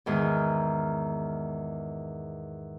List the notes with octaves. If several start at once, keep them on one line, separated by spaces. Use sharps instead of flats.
E2 G#2 D#3